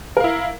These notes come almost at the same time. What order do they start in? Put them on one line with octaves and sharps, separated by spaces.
A#4 F5 E4